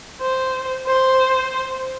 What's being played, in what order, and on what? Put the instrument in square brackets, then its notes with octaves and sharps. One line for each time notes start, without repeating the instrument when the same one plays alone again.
[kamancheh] C5
C5